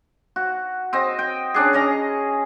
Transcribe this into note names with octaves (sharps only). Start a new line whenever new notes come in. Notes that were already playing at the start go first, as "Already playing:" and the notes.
F#4
C4 D#5
G5
C#4 D4 G#4
C#4 D#5 A#5